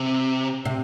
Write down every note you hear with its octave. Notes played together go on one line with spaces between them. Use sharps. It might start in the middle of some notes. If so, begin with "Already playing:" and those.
Already playing: C3
C3